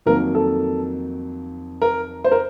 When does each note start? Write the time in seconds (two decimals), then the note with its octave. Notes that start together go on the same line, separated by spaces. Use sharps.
0.06 F2 D#3 F#3 A#3 A#4
0.35 A4
1.82 A#4
2.24 C5
2.32 A#4